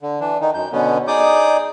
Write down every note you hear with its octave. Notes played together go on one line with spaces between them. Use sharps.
D3
E3 D4
D#3 D#4
F#2 G6
B2 D3 B3 C#4
D#4 G#4 D5 D6 D#6 G6